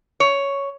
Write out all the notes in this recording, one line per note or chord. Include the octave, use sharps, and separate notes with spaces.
C#5